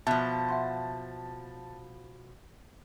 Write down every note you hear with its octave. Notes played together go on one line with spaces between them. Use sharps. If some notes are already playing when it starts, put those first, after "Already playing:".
B2 F3 E5 A5
E5 F#5 C6